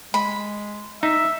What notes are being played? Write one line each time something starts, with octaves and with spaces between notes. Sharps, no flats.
G#3 B5
D#4 E5